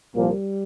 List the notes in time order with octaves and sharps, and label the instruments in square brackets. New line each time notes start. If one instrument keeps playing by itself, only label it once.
[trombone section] C2 A#2 F3 A#3 [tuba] G3